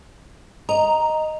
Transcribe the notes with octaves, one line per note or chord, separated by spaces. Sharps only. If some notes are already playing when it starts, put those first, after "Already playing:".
D#5 A#5